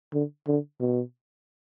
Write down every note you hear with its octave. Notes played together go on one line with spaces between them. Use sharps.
D3
D3
B2